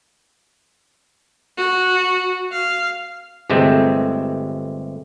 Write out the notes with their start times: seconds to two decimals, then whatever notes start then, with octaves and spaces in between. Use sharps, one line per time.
1.57 F#4
2.52 F5
3.49 G1 C3 G#3 A3 C4